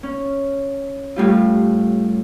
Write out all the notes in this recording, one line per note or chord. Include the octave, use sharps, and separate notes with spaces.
C#4
A2 G3 F4